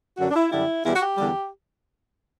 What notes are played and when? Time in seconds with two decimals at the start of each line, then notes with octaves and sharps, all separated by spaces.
0.17 F#2 D3 F#3 F#4
0.30 D4
0.35 E4
0.50 F#2 D3 G3 E4
0.83 E2 B2 G3 E4
0.94 F#4
1.01 G4
1.17 E2 D3 G3